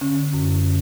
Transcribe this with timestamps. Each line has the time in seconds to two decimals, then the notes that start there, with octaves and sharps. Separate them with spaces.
0.01 D3 C#4
0.33 F#2
0.65 D3